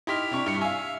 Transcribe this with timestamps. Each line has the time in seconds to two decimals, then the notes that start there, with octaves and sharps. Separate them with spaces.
0.07 D#4 E4 G4 C6 F6 B6
0.31 C3 D4 C#6
0.46 G2 C#7
0.61 E5 F5 G#5 F6